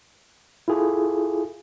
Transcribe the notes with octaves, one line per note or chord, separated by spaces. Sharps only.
E4 F4 G#4 A4